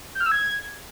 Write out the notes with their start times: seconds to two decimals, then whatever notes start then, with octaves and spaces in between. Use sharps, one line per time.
0.15 G6
0.21 F6
0.26 E6
0.32 G#6